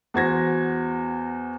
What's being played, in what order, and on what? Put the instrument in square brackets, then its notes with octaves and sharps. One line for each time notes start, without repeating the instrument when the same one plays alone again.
[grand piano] E2 F#4 C5 G#6 A#6